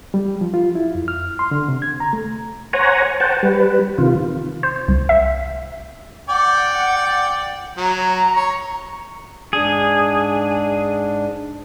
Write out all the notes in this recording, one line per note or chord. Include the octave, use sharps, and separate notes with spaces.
G3
F3
F4
E4
F2
F6
C6
D3
C3
G#6
A#5
A3
C5 C#5 F#5 G#5 A#5
C5 F#5 G5 A5
G3 B4
C3 D#3 F4
C5
C2
E5
D5 F#5 G5
F#3 A#5
C#5
G#2 D4 G#4